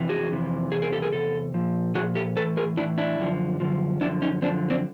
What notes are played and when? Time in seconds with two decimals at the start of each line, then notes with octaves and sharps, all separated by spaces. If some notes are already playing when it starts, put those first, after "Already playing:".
Already playing: F2 C3 E3
0.09 F#4 G#4
0.30 F2 C3 E3
0.72 E2 C3 G#4
0.82 G#4 A#4
0.92 G4 A4
1.02 G#4 A#4
1.13 E2 C3 A4
1.54 A#2 F3
1.95 A#2 F3 F#4 G#4
2.15 G4 A4
2.36 A2 E3 A4 B4
2.57 G#4 A#4
2.77 A2 D4 E4
2.81 E3
2.98 D4 E4
3.19 F#2 D3 F3
3.60 F#2 D3 F3
4.01 F#2 D3 F3 D4 E4
4.22 C#4 D#4
4.42 F#2 D3 F3 C4 D4
4.70 C4 D4